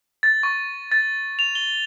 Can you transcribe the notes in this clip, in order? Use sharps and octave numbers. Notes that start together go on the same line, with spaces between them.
A6
C#6
A6
F7
G7